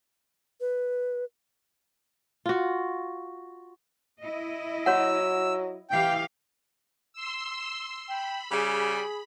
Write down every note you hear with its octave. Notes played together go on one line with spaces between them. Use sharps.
B4
F4 F#4
E4 D#5
F#3 F#4 C#5 F#5 E6
E3 G4 F5 G5
C6 E6
G5 B5
C#3 G3 G#4